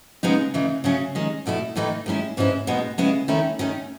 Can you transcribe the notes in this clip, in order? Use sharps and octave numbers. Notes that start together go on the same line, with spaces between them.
C#3 G#3 B3 D#4
C#3 E3 A3 D#4
C#3 F#3 A3 C#4
D#3 G#3 C#4
E2 B2 A3 E4
A2 E3 A3 D#4
D#3 G#3 C#4 E4
G#2 E3 G#3 C#4 E4
B2 G#3 B3 D#4
C#3 G#3 B3 E4
E2 D#3 A3 C#4 E4
D#3 A3 C#4